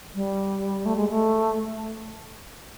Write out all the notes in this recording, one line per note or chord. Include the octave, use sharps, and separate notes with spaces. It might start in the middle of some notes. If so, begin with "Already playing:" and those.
G3
A3
G#3
A3